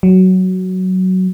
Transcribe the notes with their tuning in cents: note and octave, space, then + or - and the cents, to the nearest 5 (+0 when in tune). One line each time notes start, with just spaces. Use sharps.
F#3 +10